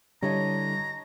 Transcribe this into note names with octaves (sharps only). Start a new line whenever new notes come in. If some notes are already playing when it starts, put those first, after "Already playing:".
D3 G3 D4 E4 C#5 D#5 A5 A#5